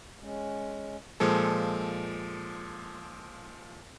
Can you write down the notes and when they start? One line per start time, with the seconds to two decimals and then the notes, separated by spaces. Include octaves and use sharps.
0.20 G#3 C#4
1.20 A#2 F3 G#3 A4